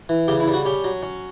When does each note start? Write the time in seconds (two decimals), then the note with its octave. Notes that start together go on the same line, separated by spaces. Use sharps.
0.09 E3
0.28 C#3 G4
0.40 E4
0.48 G3
0.54 F#4
0.65 C#4 G4
0.84 F#3
1.03 C#4